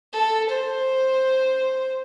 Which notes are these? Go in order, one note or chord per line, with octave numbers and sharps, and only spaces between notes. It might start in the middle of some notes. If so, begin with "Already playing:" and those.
A4
C5